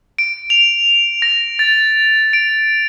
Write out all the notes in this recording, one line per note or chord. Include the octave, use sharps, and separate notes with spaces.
D7
F7
A#6
A6
D7